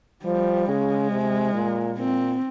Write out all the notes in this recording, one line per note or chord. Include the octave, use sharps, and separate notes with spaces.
F3 G3
C#3 G#3
C3
A#2
A#2 C4